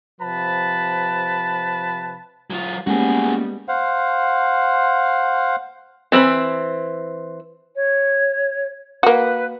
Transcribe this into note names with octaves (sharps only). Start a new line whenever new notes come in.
C3 F3 B4 A5 B5
F#3 F4
G3 G#3 A#3 B3 C#4 F#4 G#4
C5 F5 F#5
E3 C4 A#5 B5
C#5
A#3 F#4 B4